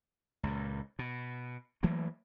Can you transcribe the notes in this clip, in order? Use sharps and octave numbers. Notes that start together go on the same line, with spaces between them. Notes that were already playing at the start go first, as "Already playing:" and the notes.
C#2 A#2
B2
E3 F#3 A3 A#3